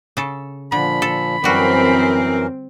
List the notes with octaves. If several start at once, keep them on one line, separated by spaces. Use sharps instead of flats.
C#3 A4
A#2 D3 F3 B5
A4
F#2 E3 G3 C4 F#4 A#4